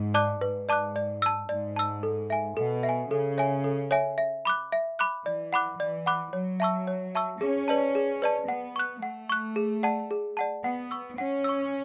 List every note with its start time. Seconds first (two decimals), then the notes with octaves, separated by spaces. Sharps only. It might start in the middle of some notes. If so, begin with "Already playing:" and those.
Already playing: G#2
0.14 D5 A5 D6 F#6
0.41 G#2 B4
0.69 D5 A5 D6 F#6
0.96 D5
1.22 A5 E6
1.49 G#2 D5
1.76 A5 E6
2.03 A4
2.30 E5 G#5
2.57 B2 A4
2.83 E5
2.89 G#5
3.10 C#3 A4
3.38 C#5 E5 G#5
3.64 A4
3.91 C#5 E5 G#5
4.18 E5
4.45 B5 D6 F#6
4.72 E5
4.99 B5 D6 F#6
5.26 E3 D5
5.53 F#5 B5 D6 F#6
5.79 E3 D5
6.06 F#5 B5 D6 F#6
6.33 F#3 C#5
6.60 E5 A5 C#6 E6
6.87 C#5
7.15 E5 A5 C#6 E6
7.41 C#4 G#4
7.68 B4 D5 A5
7.95 G#4
8.22 B4 D5 A5
8.49 B3 F#5
8.76 C#6 F#6
9.02 A3 F#5
9.29 C#6 F#6
9.56 G#4
9.83 D5 F#5 A5
10.11 G#4
10.37 D5 F#5 A5
10.64 B3 F#5
10.91 C#6 E6
11.18 C#4 F#5
11.44 C#6 E6